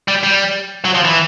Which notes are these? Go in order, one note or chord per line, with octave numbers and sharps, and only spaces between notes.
G3
G3
F#3
F3
E3